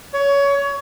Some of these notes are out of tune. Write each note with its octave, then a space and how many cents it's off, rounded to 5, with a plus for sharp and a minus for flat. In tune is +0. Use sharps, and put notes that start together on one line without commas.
C#5 +20